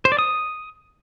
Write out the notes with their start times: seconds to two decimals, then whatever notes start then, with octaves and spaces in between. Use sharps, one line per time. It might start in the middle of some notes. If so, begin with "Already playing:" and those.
0.05 C5
0.12 D5
0.19 D#6